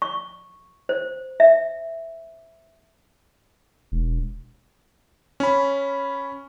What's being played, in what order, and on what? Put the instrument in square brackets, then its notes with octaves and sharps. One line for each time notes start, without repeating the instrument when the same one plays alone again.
[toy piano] C#6
C5
E5
[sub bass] E1
[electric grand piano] C#4 B5